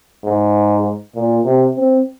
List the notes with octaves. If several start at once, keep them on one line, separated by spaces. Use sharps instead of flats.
G#2
A#2
C3
C4